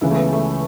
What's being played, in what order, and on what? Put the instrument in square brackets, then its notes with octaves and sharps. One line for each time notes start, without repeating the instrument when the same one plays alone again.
[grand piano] C#2 C#3 E3 C#4 [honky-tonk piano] E4
[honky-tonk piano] A3
B3
A3